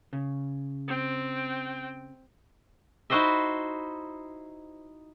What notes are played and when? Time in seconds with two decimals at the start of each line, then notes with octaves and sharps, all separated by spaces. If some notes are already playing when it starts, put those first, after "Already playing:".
0.13 C#3
0.88 C4 G5
3.10 D#4 E4 F#4 C5 D#5 E5